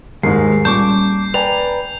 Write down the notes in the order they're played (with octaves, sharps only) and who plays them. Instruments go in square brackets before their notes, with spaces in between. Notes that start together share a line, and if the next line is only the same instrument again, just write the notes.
[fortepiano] D#2 G#2 [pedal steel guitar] G#3 [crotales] C7
[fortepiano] A#2 [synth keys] G3 C#4 [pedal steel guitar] A5 C#6 D6 [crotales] G6
[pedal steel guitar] B4 D5 A#5 [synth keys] G5 G#5 [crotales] F7